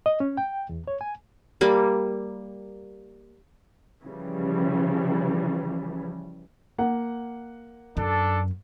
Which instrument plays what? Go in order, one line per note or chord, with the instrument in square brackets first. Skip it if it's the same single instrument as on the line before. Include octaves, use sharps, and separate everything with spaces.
[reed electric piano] D#5
C#4
G5
E2
C#5
G#5
[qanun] G3 A#3 B5
[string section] C#3 E3 F3 G3
[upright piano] A#3 F#5
[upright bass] F#2 [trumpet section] D4 A4